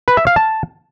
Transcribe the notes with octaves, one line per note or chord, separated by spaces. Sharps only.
B4
E5
F5
A5